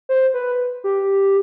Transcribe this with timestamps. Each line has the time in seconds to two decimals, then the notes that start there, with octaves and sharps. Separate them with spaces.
0.09 C5
0.34 B4
0.84 G4